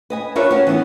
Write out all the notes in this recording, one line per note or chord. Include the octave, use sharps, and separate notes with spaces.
B4 D#5 G#5
D4 F4 A#4 B4 C#5 E5
C#4 F#4
E3 B3 F#4